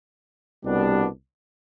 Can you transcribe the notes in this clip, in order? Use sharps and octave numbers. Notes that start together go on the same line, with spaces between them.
C2 B2 G3 B3 D4